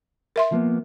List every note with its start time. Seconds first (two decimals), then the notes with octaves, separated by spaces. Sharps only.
0.36 A#4 E5 C6
0.52 F3 A#3 B3